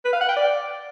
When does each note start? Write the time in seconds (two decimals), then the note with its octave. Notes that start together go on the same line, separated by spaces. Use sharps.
0.05 B4
0.13 F5
0.21 F#5
0.28 G5
0.36 D5